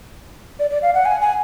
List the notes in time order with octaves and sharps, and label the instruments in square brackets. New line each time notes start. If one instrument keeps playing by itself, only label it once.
[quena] D5
D5
F5
F#5
G#5
G#5